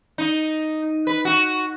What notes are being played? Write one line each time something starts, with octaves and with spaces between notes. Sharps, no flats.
D#4
B4
F#4